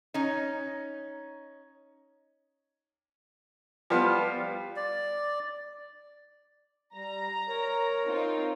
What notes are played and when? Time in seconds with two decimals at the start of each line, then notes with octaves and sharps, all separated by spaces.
0.14 C#4 D#4
3.90 F3 G3 B3 F4
4.76 D5
6.94 G3 A#5
7.49 A#4 C#5
8.06 C4 D#4 F4